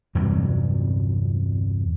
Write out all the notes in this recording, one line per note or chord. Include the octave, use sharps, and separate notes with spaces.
E2 G2 C3 F#3